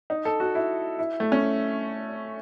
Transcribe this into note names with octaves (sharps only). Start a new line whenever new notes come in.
D#4
A4
F#4
E4
E4
A3
C#4